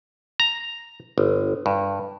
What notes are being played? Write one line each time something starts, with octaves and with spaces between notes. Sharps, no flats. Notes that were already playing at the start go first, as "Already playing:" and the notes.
A#5
G1
G2